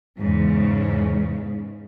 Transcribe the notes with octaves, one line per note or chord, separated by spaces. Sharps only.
E2 G#2 C#3